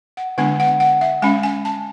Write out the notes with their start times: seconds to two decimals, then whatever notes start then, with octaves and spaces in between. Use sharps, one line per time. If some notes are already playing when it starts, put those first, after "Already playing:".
0.17 F#5
0.38 D3 G#3 B3 D4 F#5
0.60 F#5
0.80 F#5
1.01 E5
1.22 G#3 C#4 G#5
1.43 G#5
1.65 A5